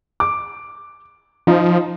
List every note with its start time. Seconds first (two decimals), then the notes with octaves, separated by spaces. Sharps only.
0.20 D6
1.47 F3 D#4